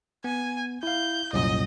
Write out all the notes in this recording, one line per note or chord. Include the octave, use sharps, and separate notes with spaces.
B3 G#5
E4 F5 G6
C2 F#2 A#2 D#5